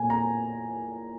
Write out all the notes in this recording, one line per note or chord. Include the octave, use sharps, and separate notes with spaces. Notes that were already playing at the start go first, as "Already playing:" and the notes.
Already playing: A#2 G#5
A#5